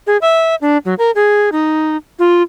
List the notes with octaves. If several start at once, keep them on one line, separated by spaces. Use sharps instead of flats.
G#4
E5
D4
F#3
A#4
G#4
D#4
F4